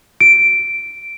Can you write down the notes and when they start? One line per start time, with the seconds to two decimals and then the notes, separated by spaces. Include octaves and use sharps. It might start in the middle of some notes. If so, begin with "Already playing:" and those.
0.21 D7